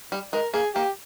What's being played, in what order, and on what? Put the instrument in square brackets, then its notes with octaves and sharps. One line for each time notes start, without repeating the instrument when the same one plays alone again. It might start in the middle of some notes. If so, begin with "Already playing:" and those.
[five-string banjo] G3
[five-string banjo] G#3 [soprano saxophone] A#4
[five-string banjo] A#3 [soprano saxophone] G#4
[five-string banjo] A#3 [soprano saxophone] G4